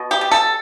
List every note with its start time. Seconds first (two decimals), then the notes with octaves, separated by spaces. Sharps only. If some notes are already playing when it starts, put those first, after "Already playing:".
Already playing: B2
0.11 G4
0.21 G3
0.31 A4